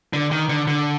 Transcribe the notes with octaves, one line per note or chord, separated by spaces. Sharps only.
D3
D#3
D3
D3